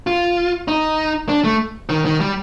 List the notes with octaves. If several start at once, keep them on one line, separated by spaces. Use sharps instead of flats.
F4
D#4
D4
A3
D#3
D#3
G3